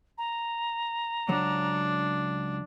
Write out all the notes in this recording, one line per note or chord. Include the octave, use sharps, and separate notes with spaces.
A#5
C#2 F#3 D4 C#5